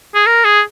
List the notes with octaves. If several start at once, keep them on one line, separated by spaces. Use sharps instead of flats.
G#4
A#4
G#4